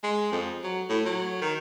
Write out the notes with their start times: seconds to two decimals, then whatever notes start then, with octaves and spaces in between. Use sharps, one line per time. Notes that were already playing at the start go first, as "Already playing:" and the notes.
0.04 G#3
0.32 F2
0.64 F#3
0.89 A2
1.06 F#3
1.41 D#3